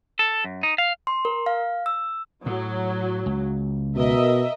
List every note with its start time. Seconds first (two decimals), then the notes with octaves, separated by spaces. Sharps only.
0.19 A4
0.44 F#2
0.63 D#4
0.78 F5
1.07 C6
1.25 A#4
1.46 F5
1.86 E6
2.46 A2 F#3
3.26 C#2
3.96 B2 A#4 D#5 E5